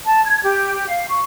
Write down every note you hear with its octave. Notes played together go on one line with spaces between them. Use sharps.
A5
G#6
G4
F5
C#6